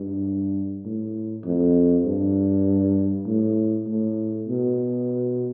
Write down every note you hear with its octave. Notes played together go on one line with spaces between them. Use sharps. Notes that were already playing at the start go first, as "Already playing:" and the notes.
Already playing: G2
A2
F2
G2
A2
A2
B2